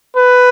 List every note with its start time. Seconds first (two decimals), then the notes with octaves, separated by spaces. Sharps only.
0.16 B4